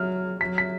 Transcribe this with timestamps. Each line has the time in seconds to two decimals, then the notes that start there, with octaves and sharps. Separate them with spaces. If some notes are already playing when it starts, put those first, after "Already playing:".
Already playing: F#3 F6
0.41 F#3 B6
0.58 B6